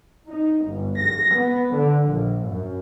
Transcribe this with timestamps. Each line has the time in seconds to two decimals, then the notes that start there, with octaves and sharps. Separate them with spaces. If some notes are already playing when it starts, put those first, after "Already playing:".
0.29 D#4
0.68 G1
1.00 A#6
1.37 B3
1.74 D3
2.11 A#1
2.49 F#2